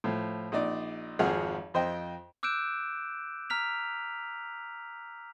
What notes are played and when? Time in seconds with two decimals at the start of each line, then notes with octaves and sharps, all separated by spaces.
0.04 A2 F3
0.52 A#1 D#4 D5
1.19 G#1 F2 F3 G#4 F5 F#5
1.74 F2 C5 D#5 G5
2.43 D6 E6 F#6 G6 D7 E7
3.50 A#5 F6 B6 F7